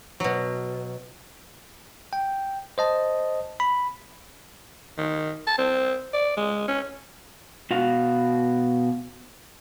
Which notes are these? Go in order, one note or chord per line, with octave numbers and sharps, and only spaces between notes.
B2 F#3
G5
C5 D#5 A5
B5
D#3
A5
C4
D5
G#3
C#4
B2 F#4 F5